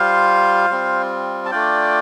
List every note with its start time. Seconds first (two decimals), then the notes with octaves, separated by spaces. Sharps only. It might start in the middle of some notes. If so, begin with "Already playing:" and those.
Already playing: G3 F4 C5 F5
0.70 G3 C4 F4
1.45 A5
1.51 A3 D4 F4 D5 G5